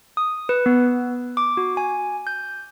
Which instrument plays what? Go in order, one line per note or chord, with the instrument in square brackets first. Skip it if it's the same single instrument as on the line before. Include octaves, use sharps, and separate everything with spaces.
[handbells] D#6
B4
B3
D6
F#4
G#5
G6